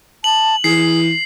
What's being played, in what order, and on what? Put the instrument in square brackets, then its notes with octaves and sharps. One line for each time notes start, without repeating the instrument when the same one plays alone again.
[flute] A5 [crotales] F#7
[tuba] E3 [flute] G#4 [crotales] C7